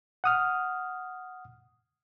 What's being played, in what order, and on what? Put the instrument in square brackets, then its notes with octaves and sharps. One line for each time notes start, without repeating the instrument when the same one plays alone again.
[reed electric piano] F#5 D#6 F6